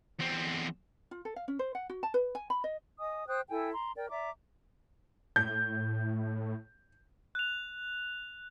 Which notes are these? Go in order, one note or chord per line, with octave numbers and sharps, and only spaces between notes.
E2 C4
F4
A4
F5
C#4
C5
F#5
F#4
A5
B4
G#5
B5
D#5
D#5 G#5 D#6
C5 G5 D#6 F#6
E4 A4 G5 G#5
A#5 C6
A#4 D5 G5
D5 E5 A#5 D6
A2 G6
F#6 F7